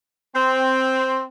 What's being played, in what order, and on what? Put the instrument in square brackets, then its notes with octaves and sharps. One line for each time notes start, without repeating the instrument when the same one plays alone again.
[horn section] C4